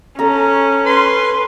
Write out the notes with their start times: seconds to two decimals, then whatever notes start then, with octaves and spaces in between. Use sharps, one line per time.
0.19 C#4 A4 A#5
0.86 B4 C6